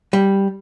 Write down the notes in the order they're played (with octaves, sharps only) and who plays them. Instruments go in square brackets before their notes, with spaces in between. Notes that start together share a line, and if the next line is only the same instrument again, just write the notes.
[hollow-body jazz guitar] G3